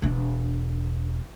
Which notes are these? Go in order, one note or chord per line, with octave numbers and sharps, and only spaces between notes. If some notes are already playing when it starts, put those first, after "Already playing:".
E1 D4